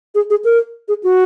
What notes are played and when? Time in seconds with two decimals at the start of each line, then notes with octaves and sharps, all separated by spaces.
0.15 G#4
0.30 G#4
0.45 A#4
0.88 G#4
1.03 F#4